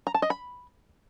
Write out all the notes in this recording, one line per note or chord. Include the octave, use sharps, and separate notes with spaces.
A#5
A5
D#5
B5